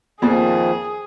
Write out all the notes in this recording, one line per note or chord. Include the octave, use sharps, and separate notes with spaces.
F2 A#2 D#3 F3 G#4